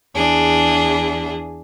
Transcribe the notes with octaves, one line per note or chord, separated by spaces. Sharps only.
E2 D4 G#4